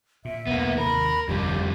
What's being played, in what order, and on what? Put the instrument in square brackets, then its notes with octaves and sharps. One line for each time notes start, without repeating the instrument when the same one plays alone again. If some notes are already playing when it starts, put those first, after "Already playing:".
[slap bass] A#2 [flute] E5
[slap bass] B1 E2 G2 [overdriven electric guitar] A#3 B3
[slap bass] D#2 C3 D#3 [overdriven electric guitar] A#4 [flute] B5
[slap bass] D1 G1 A3 [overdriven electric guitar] F2 G3 [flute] G4